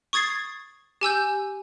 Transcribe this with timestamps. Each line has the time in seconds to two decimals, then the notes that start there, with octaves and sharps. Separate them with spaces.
0.13 C#6 D#6 G#6 A6 C7
1.01 G4 G#5 E6 G6